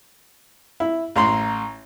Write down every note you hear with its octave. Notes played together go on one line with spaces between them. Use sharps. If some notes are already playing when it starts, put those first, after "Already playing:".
E4
A1 A#5 C6